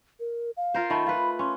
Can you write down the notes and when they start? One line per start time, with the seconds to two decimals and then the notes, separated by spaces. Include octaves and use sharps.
0.20 A#4
0.57 F5
0.74 F4 A#4 C5
0.90 D#3 A3 B5
1.06 F4 B4
1.39 C#4 C6